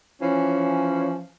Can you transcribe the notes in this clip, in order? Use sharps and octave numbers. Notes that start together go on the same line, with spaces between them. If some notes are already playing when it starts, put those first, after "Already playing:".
E3 F3 C#4